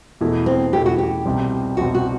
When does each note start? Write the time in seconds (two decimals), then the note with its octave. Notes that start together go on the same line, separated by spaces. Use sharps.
0.21 E2 B2 A3 E4
0.46 C4
0.73 E2 B2 A3 E4 G4
0.86 F#4
0.98 G4
1.26 C2 B2 G3 C4
1.77 C2 B2 G3 C4 F#4
1.94 F#4